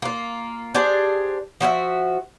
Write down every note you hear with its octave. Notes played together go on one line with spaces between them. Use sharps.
A#3 F4
D4 G4 G#4 C5
F3 F#4 C5 E5